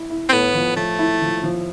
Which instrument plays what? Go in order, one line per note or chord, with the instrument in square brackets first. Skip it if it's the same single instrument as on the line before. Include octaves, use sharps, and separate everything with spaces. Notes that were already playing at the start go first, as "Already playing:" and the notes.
Already playing: [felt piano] E4
E4
[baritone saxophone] C4
[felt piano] A2 [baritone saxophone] B3
[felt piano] F3
[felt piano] F3 [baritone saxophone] A3
[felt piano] E4
F3
F3